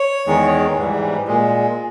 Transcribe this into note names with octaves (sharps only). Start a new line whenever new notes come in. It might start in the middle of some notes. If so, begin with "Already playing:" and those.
Already playing: C#5
E2 D#3 G#3
G#2 E3 G3
A#2 G#3